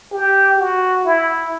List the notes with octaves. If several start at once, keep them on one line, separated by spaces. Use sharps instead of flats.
G4
F#4
E4